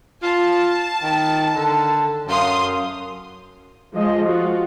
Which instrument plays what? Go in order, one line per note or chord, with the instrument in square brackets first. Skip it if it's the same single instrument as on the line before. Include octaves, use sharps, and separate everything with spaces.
[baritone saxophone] F4 [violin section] A5
[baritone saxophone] D#3
D3
[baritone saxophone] F#2 [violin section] F5 C6 D#6
[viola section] F3 G#3 D#5
F4 F#4